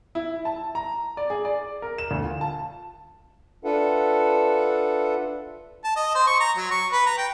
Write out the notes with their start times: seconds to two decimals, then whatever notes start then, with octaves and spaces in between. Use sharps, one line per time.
0.15 E4
0.45 A5
0.75 A#5
1.17 D5
1.30 G#4
1.45 D5
1.82 A#4
1.98 E7
2.11 D2
2.23 F4
2.41 A5
3.65 D4 F4 A4 B4 E5 F#5
5.84 A5
5.96 D#5
6.15 C5
6.27 C#6
6.40 A#5
6.57 F#3
6.71 C#6
6.92 B4
7.06 A#5
7.18 G5